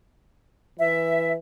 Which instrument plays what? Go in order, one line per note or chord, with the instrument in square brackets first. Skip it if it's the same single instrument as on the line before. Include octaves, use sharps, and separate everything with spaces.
[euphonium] E3 [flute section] E5